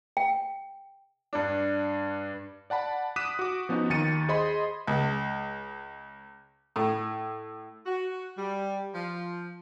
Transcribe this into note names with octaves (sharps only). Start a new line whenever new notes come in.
G5
G2 D4
D5 F#5 A5 B5
D6 D#6 F#6 B6 D#7 E7
F#4 D6
F3 B3 C#4 D#4 F#4
D#2 D#3 A6 C#7 D#7
G#4 C5 D#5 B5 C6
C#2
A2
F#4
G3
F3